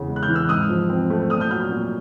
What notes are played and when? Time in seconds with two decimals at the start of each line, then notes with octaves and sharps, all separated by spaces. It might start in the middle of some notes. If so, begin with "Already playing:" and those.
Already playing: E2 C#3
0.08 G#3
0.16 F#6
0.23 F6 G6
0.29 E3
0.36 E6 F#6
0.49 G#2 D#6 F6
0.69 F3
0.90 C4
1.10 A3
1.30 A#2 D#6 F6
1.40 F6 G6
1.51 F#3 F6 G6
1.71 A#2